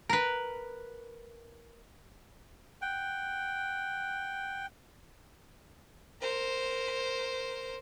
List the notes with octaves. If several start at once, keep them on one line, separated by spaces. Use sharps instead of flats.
A#4 B4
F#5 G5
A#4 C5